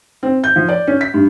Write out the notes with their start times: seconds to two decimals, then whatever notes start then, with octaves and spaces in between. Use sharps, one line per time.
0.23 C4
0.44 G6
0.56 F3
0.69 D5
0.87 C#4
1.01 B6
1.14 G2